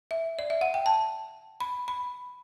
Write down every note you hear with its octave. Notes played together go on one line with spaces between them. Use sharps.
E5
D5
E5
F#5
G5
A5
B5
B5